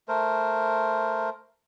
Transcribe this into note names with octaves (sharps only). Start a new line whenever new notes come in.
A3 A#4 C5